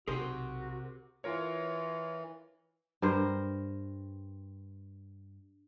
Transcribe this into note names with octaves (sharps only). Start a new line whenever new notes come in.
B1 C3 F#4 G#4 A#4 C5 G5
E3 F4 A#4 C#5
G2 A#4 C5